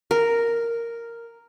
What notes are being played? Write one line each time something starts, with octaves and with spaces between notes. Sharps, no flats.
A#4